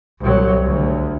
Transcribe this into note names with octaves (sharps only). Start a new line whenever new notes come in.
C2 F#3
D2